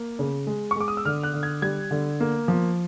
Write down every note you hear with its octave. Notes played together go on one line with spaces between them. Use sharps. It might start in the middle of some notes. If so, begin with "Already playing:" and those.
Already playing: A#3
C#3
G#3
C#6
G#3 D6
D#6
E6
D3 F6
F#6
D3
G#6
G3 G#6
D3
A#3
F3